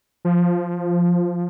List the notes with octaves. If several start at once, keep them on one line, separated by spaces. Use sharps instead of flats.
F3